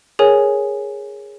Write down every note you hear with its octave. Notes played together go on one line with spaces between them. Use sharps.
G#4 A#4 C#5 G#5